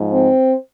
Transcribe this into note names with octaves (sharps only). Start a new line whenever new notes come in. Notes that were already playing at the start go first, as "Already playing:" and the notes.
Already playing: G#2 F3
C4